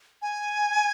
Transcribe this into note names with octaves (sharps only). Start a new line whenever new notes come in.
G#5